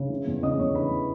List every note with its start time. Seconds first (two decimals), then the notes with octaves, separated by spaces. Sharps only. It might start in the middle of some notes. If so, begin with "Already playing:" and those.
Already playing: C#3
0.10 E3
0.27 E2
0.43 C#3 D#5 D#6
0.59 E2 C#5 C#6
0.75 E3 B4 B5